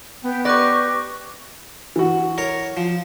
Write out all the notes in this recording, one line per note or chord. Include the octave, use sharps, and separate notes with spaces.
B3 B4 G5
G4 B4 D5 C#6 D6 F#6 A#6
E3 F#4
A#4 C#5
F3